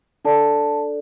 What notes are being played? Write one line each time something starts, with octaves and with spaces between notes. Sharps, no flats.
D4 A4 D5 A5